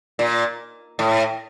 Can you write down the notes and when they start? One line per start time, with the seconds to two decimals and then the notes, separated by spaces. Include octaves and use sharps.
0.19 A#2
0.99 A2